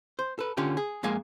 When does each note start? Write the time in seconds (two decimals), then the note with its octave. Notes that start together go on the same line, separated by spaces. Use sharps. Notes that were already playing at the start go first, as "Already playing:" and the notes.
0.19 C5
0.39 A4 B4
0.57 D3 C#4 F4 G4
0.77 G#4
1.03 F2 G#3 A#3 F5 G#5